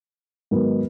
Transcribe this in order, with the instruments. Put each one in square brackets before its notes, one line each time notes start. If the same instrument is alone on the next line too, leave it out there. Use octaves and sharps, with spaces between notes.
[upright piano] G#2 D#3 F#3 B3